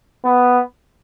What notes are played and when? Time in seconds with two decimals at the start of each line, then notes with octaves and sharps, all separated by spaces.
0.25 B3